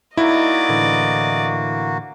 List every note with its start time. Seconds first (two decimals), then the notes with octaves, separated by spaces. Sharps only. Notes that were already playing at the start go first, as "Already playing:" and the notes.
0.17 A#3 D#4 E4 F#4 D5 D#5
0.69 A2 D3 E3